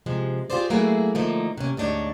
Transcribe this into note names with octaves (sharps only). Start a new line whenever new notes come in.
C3 F3 G#3
F4 G4 G#4 C5 D5
F#3 A3 A#3 E4 F#4 G#4
D3 F3 A3 A#3 D#4
C3 A#3 C#4
D2 G#2 D4 D#4 C#5